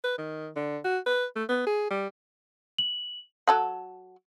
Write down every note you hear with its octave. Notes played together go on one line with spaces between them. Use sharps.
B4
D#3
D3
F#4
B4
A3
B3
G#4
G3
F#7
F#3 A4 F#5